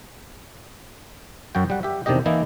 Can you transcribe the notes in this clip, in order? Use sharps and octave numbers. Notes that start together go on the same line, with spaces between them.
F#2 F#3 F#4 G5
G3 F#5
G4 E5
E2 C3 D#3 D4 G4 D#5
E3 A#3 D#4 E4